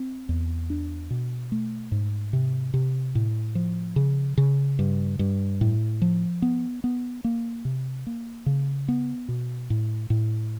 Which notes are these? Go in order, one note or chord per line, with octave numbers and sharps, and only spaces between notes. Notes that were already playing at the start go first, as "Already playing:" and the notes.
Already playing: C4
E2
D4
B2
A3
G#2
C3
C3
A2
F3
C#3
C#3
G2
G2
A2
F3
B3
B3
A#3
C3
A#3
C#3
B3
B2
A2
A2